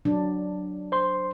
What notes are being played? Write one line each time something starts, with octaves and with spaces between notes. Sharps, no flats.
F#3 D4
C5 C6